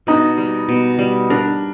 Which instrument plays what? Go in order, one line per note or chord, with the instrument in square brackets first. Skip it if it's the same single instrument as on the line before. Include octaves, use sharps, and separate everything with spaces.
[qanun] B2 [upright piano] D#4
[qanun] G3
B2
G3
[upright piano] D4 [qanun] A#4